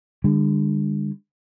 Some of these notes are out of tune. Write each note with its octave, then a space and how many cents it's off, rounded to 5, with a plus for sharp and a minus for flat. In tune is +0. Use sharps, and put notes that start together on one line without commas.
D3 +20 G#3 -45